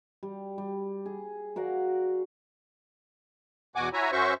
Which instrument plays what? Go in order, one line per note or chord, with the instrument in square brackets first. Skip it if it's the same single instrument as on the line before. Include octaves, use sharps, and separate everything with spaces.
[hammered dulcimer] G3
G3
G#4
F#4 A#4 D5 F5
[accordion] E2 B2 F#4 F#5 G#5 D6
E4 F#4 C#5 E5 G#5 A#5
F#2 C#4 F#4 C5 E5 C#6